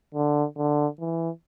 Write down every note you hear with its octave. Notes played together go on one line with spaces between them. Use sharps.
D3
D3
E3